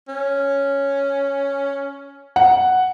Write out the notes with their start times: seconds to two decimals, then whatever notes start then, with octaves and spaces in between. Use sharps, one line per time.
0.09 C#4
2.36 F#5